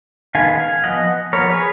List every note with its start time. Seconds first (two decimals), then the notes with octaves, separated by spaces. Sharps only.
0.35 D#3 G#3 B3 F5 G#5
0.60 F5 G#5
0.84 F3 B3 D#5 F#5
1.33 F3 B3 A#4 C#5
1.49 G#4 B4